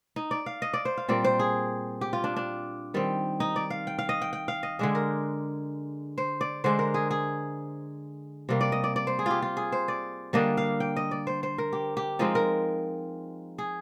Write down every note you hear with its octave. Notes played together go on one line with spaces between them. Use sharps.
D#4
D5
F5
D#5
D5
C5
F5
A#2 G3 C4 D5
C5
G#4
G4
F4
D4
D4
D#3 G3 C4
D#4
D5
F5
G5
F5
D#5
G5
G5
F5
D#5
D3 G#3 D4 G#4
A#4
C5
D5
D3 G#3 D4 C5
A#4
G#4
G#4
C3 G3 A#3
D5
D#5
D5
D5
C5
G#4
F4 G4
F4
G#4
C5
D5
D3 G3 A#3 D4 D#5
F5
G5
D#5
D5
C5
C5
A#4
G4
G4
F3 G#3 C4 D#4
A#4
G#4